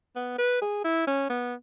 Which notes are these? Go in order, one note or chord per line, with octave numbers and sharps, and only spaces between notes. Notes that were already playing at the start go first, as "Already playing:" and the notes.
B3
B4
G#4
E4
C#4
B3